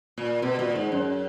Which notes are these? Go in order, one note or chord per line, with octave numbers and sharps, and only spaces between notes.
A#2
B2
A#2
G#2
F#2